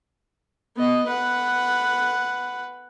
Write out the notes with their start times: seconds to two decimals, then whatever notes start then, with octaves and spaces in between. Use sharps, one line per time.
0.76 B3 D#5
1.07 B4 F#5